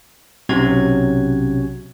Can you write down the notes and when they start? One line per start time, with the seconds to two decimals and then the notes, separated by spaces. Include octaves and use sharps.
0.49 B1 C3 F#3 C#4 F#4 G#6